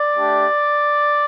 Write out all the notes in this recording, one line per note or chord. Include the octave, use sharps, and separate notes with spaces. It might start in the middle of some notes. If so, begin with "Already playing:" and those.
Already playing: D5
A3 D4 G4